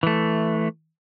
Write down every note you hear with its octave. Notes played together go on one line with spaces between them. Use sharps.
E3 A3